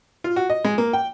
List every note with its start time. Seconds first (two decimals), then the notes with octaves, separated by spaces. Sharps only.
0.24 F4
0.36 F#4
0.50 D#5
0.64 G#3
0.78 A#3
0.93 G5